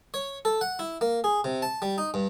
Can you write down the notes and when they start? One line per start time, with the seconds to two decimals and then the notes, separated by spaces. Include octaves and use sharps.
0.14 C#5
0.45 A4
0.61 F#5
0.79 E4
1.01 A#3
1.24 G#4
1.44 C3
1.62 A5
1.82 G3
1.98 D#4
2.14 G2